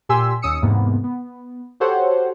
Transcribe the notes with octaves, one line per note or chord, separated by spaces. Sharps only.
A#2 G4 G#5 C6 E6 B6
D#2 C#4 D#6 E6 C#7
E2 G#2 C3 A#3 B3
B3
F#4 G4 A4 C5 C#5 F#5